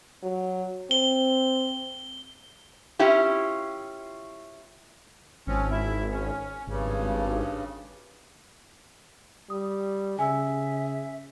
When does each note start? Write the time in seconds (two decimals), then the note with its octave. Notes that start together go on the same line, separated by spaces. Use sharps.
0.23 F#3
0.91 C4 G7
2.99 C#4 E4 F4 G4
5.47 G#1 F3 C4 C#4
5.71 E4 E5
6.11 C#4
6.67 G#1 G2 C#3
9.50 G3 D#6
10.19 C#3 G#4 E5 G#5 E6